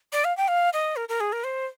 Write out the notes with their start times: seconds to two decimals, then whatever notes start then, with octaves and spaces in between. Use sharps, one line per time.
0.13 D5
0.24 F5
0.37 G5
0.48 F5
0.73 D#5
0.96 A#4
1.09 A#4
1.20 G#4
1.32 A#4
1.44 C5